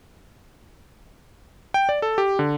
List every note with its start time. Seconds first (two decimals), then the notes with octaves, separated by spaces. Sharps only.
1.74 G5
1.89 D5
2.02 A4
2.18 G4
2.39 D3